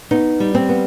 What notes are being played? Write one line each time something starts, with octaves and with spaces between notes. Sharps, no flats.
B3 D#4
G3
C4
B3